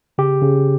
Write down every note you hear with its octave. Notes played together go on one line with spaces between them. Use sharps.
C#3 G4
C#3